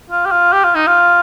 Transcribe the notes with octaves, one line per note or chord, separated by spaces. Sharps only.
F4
G4
F4
G4
F4
D#4
F4